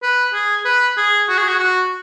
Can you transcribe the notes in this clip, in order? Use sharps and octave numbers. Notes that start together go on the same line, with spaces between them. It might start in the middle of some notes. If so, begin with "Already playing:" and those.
B4
G#4
B4
G#4
F#4
G#4
F#4
F#4